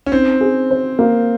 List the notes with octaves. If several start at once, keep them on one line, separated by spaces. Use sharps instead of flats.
C#4
C4 D#4
G#4
C5
A#3